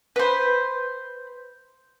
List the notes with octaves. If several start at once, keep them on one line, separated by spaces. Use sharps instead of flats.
B4 C5